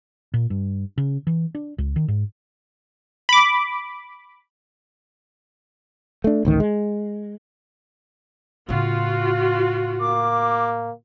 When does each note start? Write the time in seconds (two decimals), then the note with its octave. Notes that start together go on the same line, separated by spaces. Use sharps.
0.34 A#2
0.50 G2
0.98 C#3
1.27 E3
1.55 D4
1.78 C#2
1.96 D#3
2.08 G#2
3.29 B5 D6
6.24 A3 D4
6.45 A1 D2 D#3
6.60 G#3
8.69 A2 C#3 F4 F#4
10.00 A#3 D6